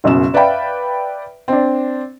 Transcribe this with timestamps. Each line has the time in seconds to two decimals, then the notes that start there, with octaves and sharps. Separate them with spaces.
0.04 F#1 F#2 B2 E7
0.34 B4 D5 E5 F5 G5 B5
1.48 C4 D4